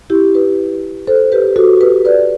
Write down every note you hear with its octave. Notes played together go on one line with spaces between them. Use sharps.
E4 G4
G4 B4
A4 C5
G4 B4
F#4 A4
G4 B4
B4 D5